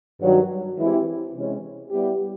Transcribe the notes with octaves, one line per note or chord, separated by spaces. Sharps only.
G2 D#3 F#3
E3 G#3 C4 E4 G4
C3 E3 G#3 C#4
G3 B3 E4 G4